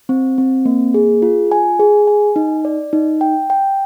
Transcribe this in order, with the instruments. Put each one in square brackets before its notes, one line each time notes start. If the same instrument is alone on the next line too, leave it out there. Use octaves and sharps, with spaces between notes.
[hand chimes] C4
C4
A#3
G#4
F4
G#5
G#4
G#5
D#4
D5
D#4
G5
G5